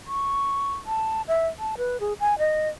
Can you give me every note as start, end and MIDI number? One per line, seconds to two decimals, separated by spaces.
0.07 0.73 85
0.86 1.22 81
1.28 1.47 76
1.59 1.75 81
1.78 2.00 71
2.00 2.13 68
2.20 2.38 80
2.39 2.68 75